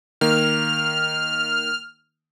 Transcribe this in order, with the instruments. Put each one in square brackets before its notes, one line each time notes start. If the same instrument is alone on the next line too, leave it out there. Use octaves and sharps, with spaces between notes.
[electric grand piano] D#3 A#3 [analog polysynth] F6